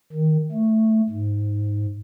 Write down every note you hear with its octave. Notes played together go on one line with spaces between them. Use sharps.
D#3
A3
G#2